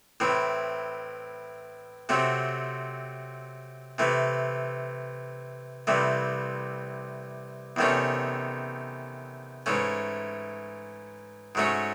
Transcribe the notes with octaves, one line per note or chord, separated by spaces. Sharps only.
A2 E3 C4
C3 F#3 A3 C4
C3 E3 A3
C2 C3 E3 A3
E2 C3 D#3 A3 C#4
G#2 E3 A3 C#4
G#2 F#3 A3 C#4